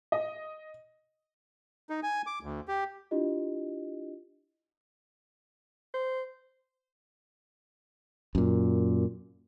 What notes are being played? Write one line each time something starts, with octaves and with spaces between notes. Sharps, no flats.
D#5
D#4
G#5
D6
D2
G4
D4 E4 F4 G4 D#5
C5
F#2 A#2